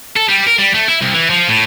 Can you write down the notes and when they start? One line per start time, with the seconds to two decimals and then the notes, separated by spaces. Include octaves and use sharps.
0.16 A4
0.29 G3
0.47 A#4
0.59 G3
0.74 A3
0.89 E4
1.02 C2
1.14 E3
1.30 F3
1.49 A2